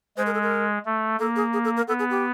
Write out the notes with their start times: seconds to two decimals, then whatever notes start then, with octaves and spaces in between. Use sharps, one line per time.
0.17 G#3 C5
0.26 A#4
0.34 A4
0.42 A#4
0.85 A3
1.19 A#3 A4
1.36 G#4
1.53 G#4
1.64 A4
1.77 A#4
1.88 B3 A4
1.99 G#4
2.10 G4